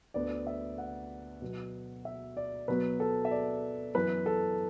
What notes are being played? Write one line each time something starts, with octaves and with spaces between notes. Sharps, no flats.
D2 D3 B3 D5
E5
F#5
B2 F#3 B3
E5
D5
B2 F#3 B3 B4
A4
E5
D5
F#2 E3 B3 B4
A4